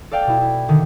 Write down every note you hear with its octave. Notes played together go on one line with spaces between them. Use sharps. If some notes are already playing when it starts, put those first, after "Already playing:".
A4 D5 F5 G5
B2 E4
E4
D3 D#3